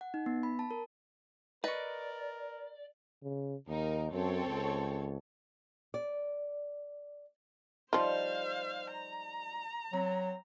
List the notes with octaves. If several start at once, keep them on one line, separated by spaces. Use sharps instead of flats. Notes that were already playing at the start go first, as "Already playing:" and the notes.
F#5
D#4
B3
B5
A5
A#4
A#4 B4 D5 D#5 C#6
C#3
D#2 D#4 A#4
F#2 C4 A4 C#5
C#2
D5
F3 G3 D#4 F4 C5 F5
A#5
F#3 C4